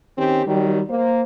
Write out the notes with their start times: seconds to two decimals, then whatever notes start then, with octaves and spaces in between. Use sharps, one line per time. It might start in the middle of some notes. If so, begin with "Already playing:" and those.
0.18 D#3 C4 C#4 G4
0.47 D#3 F#3 G3
0.89 A#3 C5